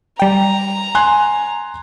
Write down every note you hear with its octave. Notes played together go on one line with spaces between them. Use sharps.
G3 G5 A#5
G#5 C6 F#6